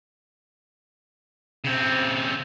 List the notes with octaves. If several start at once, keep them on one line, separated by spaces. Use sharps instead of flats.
C#3 C4